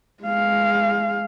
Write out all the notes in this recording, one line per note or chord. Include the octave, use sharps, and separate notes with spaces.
G#3 F5